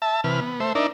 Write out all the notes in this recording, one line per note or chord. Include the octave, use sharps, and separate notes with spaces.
E5 A5
C3 E3 B4 F6
B3
A3 C5 E5
D4 D#4 A#4 D5 E5